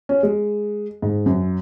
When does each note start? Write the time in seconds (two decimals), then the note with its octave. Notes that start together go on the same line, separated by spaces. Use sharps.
0.09 C#4
0.23 G#3
1.02 G#2
1.26 F#2